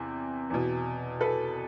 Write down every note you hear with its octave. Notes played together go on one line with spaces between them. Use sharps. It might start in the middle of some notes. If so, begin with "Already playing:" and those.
Already playing: E2 C3
E2 B2
A4 B4